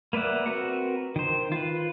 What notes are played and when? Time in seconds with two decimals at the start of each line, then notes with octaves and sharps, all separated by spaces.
0.13 A#3 B4 D5 E5 F#5
0.46 C4 F#4 A#4 B4 F#5
1.16 D#3 C5
1.52 F4 B4